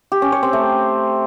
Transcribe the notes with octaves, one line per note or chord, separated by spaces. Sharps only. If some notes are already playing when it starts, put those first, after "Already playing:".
G4
C#4
C#5
C4
A3